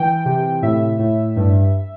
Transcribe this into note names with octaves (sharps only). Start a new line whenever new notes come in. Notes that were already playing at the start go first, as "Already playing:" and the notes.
Already playing: E3 G5
C3
A2 E5
A2
G2